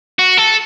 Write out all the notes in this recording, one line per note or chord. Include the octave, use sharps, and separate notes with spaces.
F#4
A4